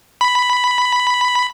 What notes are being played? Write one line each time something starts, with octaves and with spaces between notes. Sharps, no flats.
B5